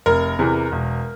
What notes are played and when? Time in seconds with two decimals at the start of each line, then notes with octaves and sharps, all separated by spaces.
0.06 F1 A#4
0.39 E2 C3 E3
0.72 E1